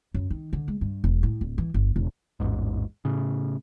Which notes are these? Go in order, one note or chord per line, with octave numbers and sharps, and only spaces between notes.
F#2
D#3
D3
G#3
G2
E1
A2
D1
E3
G1
E1
A1 E2 G#2
A2 C#3